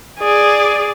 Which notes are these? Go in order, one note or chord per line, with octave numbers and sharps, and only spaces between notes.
G#4 D5